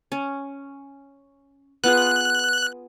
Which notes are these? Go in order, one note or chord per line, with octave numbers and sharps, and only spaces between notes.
C#4
B3 F4 G#4 F#6